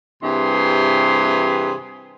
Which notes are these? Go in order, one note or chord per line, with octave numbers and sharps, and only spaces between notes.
G2 C3 E3 G#4 C6